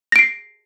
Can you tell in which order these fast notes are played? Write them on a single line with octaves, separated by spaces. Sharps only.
A#6 D7 C7